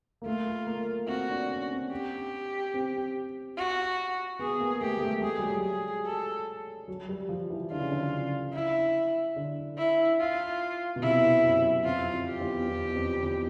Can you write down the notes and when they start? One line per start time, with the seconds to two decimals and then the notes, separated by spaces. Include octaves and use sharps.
0.22 A#3
0.26 A3 F4
0.67 A#3
1.08 C4 F#4
1.29 D4
1.50 C#4
1.71 C4
1.92 G4
2.74 C4
3.57 F#4
4.39 B3 G#4
4.60 A#3
4.81 A3 G4
4.97 G#3
5.01 A3
5.22 G#3 G#4
5.30 G3
5.39 F#3
5.48 G3
5.64 G#4
6.05 A4
6.88 F#3
7.09 G3
7.29 F3
7.50 E3
7.71 D3 F4
7.81 C#3
7.92 D3
8.53 E4
9.36 D3
9.78 E4
10.20 F4
10.96 B2
11.02 C3 E4
11.44 F#2
11.85 F2 F4
12.13 F2
12.27 G4
12.41 E2
12.68 E2
12.95 F2
13.23 E2